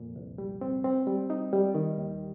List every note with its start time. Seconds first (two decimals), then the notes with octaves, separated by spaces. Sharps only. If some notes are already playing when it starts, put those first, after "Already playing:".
Already playing: F2 A#2
0.16 C2
0.38 G3
0.61 C4
0.84 C4
1.07 G3
1.30 D#4
1.53 G3
1.75 D#3
1.98 D#2